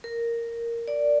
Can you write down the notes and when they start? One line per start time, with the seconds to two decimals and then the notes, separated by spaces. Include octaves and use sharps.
0.04 A#4
0.88 D5